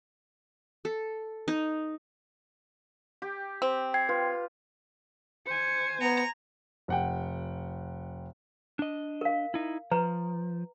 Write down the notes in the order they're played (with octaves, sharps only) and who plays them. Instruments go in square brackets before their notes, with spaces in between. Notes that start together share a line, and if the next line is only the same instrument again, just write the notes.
[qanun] A4
D#4
[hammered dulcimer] G4
[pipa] C4
[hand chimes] G5 G#6 C7
[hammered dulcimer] F4 [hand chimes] B4
[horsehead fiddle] C5 G#5 [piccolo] C#7
[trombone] B3 [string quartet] A#5 [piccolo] C#7
[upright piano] F1 F#5 G5
[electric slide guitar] D4 D#5
[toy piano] A#4 F5
[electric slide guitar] D#4 E4
[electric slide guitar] F3 [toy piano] B4 A#5